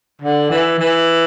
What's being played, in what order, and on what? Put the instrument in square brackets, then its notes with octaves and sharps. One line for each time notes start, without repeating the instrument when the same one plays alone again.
[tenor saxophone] D3
E3
E3